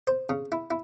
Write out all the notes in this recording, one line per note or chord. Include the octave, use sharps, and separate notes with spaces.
C5
C#3
E4
E4